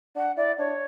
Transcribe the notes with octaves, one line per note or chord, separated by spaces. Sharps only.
D4 F#5
E4 D5
D4 C#5